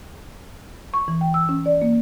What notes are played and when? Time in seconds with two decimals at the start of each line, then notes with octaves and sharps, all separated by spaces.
0.94 C#6
1.08 E3
1.21 G5
1.34 E6
1.49 C#4
1.66 D5
1.82 A#3